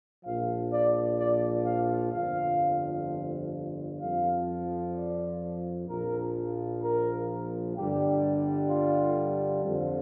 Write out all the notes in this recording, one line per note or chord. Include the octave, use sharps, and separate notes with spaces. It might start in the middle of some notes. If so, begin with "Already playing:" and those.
A#1 A#2 F3 F5
D5
D5
F5
G1 F2 F3 F5
F2 F3 F5
D5
A#1 A#2 F3 A#4
A#4
G1 G2 D3 G3 G4
F4
F2 D3 F3